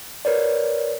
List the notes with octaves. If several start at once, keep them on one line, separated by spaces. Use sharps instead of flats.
A#4 B4 C#5 D5